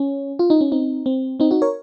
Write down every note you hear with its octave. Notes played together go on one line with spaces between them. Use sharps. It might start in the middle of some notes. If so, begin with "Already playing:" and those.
Already playing: C#4
F4
D#4
C#4
C4 D#4
C4
C4 D#4
D#4 F#4
A#4 C#5